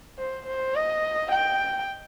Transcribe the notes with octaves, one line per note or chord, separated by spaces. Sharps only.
C5
C5
D#5
G5